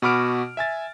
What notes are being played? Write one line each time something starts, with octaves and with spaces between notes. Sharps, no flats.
B2 F#4 B5 D6 F6 D7
E5 G#5 A6